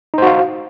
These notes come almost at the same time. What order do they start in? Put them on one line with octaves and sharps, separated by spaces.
D#4 C5 F#4 F5